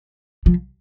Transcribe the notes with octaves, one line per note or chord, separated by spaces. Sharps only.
F3